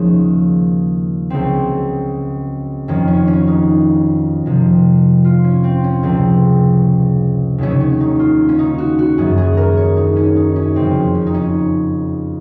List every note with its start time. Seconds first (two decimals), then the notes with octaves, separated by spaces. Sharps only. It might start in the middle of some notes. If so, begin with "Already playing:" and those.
Already playing: D#2 C#3 F3 G#3 C#4
1.30 C#2 C#3 F#3 C4
2.88 F2 D#3 F#3 C#4
3.08 C#4
3.28 C#4
3.47 D#4
4.46 F2 C3 F3
5.25 F4
5.44 C#4
5.64 C4
5.84 C#4
6.03 C#2 C3 F3 G#3 C4
7.58 D#2 C#3 F#3 C#4
7.80 C#4
8.00 D#4
8.19 F4
8.49 C#4
8.59 D#4
8.78 F#4
8.99 F#4
9.18 F#2 D#3 F#3 G#4
9.37 G#4
9.57 A#4
9.77 C#5
9.97 D#4
10.16 C#4
10.36 D#4
10.56 C#4
10.75 F2 C#3 G#3 C4
10.95 C#4
11.15 C#4
11.27 D#4
11.34 C#4